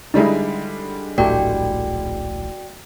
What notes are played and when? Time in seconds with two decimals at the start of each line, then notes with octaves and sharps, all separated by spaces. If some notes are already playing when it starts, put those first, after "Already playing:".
0.14 D3 G3 G#3 D#4 E4
1.18 D1 A#1 A2 A3 F#4 G4 D5 G5